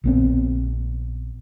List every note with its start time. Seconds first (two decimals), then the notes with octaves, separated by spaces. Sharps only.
0.04 A#1 B3 C4